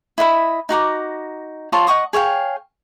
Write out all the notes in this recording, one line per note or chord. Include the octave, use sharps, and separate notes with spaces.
E4 D#5 F5 B5
D#4 F#4 A#5 D6
F4 C#5 A5 C6
D#5 F#5 C#6 D#6
G#4 C#5 F5 G5